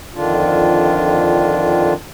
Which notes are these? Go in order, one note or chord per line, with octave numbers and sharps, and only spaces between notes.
F2 D3 D#3 D4 F4